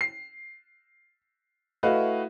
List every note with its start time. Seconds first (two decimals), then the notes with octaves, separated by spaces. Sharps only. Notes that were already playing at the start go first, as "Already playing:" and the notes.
0.01 C7
1.83 A3 E4 F#4 B4 D#5 F5